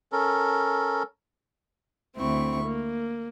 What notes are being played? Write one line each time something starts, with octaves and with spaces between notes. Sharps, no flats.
C#4 A4 A#4
D2 C4 E4 C#6
A#3